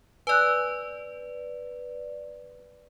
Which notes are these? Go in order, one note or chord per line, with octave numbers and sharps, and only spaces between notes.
B4 D5 G#5 E6 F#6